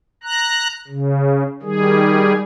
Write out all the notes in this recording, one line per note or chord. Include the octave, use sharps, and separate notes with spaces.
A#5 F#6
C#3
D#3 G3 G#4